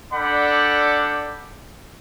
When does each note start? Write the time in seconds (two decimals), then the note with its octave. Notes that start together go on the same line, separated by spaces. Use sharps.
0.13 D4 A4 D5 F#5 G5 B5